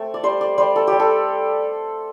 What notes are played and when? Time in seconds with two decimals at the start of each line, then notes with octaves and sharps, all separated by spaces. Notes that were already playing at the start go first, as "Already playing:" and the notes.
Already playing: A3 C4 A4
0.14 D5
0.23 G3 C5
0.41 D5
0.58 G3 C5
0.76 A4
0.87 G3 G4
1.00 A4